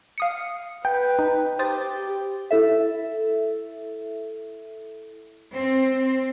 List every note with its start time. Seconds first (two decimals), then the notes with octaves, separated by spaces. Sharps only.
0.18 F5 D#6 C#7
0.85 B4 G5
1.19 D#4
1.59 G4 C5 D#6 A6
2.51 E4 A4 E5
5.55 C4